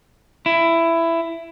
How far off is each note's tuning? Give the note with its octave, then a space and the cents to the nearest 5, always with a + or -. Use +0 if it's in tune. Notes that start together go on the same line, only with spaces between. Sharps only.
E4 +15